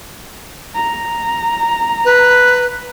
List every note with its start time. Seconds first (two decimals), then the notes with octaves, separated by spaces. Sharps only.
0.75 A#5
2.05 B4